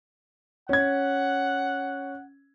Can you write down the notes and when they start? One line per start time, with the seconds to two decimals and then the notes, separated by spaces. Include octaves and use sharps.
0.69 C#4 F#5 G#6